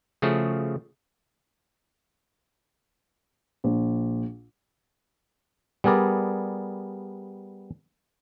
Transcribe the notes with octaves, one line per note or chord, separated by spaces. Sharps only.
C#3 F3 A3 F#4 G#4 A4
A#1
G3 B3 G#4 A#4 D5